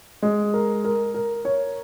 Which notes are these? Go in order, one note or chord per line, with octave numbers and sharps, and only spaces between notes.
G#3
A#4
A#4
A#4
C#5